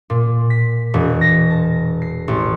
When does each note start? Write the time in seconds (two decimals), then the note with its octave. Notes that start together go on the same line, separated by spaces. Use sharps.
0.10 A#2
0.50 B6
0.94 E1
1.21 A#6
1.50 A5
2.02 C7
2.28 A1